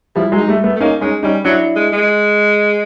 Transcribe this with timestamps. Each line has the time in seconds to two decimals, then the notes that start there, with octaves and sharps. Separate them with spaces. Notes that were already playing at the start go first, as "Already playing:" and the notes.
0.16 F3 G3 E4
0.32 F#3 G#3
0.37 D#4
0.48 G3 A3
0.64 A3 B3
0.76 A3
0.80 A#3 C#4 D#4
1.01 G#3 C#4 D#4
1.23 G3 C#4 D#4
1.44 F#3 D4 E4
1.76 G#3
1.93 G#3